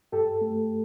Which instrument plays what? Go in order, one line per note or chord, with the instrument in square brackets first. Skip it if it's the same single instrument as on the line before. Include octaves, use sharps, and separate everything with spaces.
[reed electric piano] G2 G4 A4
A3